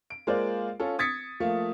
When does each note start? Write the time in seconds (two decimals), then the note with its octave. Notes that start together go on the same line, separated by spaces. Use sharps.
0.10 D7
0.27 G#3 A#3 F4 A#4 C5 D5
0.80 C#4 F4 A4
0.99 D#6 G#6 A6 B6 C#7
1.40 F3 A3 A#3